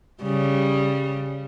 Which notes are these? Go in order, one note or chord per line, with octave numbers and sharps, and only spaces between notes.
C#3 G3